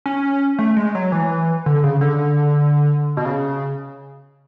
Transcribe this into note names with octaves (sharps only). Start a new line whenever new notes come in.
C#4
A3
G#3
F#3
E3
D3
C#3
D3
B2
C#3